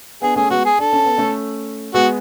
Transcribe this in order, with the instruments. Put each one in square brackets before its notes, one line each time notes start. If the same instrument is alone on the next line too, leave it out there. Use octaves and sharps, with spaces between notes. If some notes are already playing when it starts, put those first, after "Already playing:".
[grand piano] B3 D4 [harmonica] G#4
[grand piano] A3 C#4 [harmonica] G#4
[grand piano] G#3 B3 [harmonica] F#4
[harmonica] G#4
[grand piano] D4 [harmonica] A4
[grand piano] C#4
B3
A3 C#4
[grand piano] G#3 B3 [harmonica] F#4